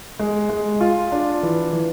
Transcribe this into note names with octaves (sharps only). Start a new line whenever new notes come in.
G#3
G#3
F4
D4
E3
E3